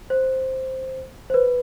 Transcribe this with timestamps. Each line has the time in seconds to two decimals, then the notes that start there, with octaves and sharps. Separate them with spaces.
0.10 C5
1.30 C5
1.34 B4